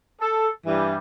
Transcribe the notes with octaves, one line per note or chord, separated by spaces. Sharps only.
A4
G2 E3 G3